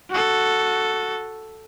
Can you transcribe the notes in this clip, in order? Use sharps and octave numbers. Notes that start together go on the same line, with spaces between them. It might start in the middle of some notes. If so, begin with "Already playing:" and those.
F#4 A4